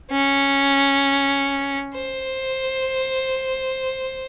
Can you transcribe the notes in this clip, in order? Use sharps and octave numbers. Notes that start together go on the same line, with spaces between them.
C#4
C5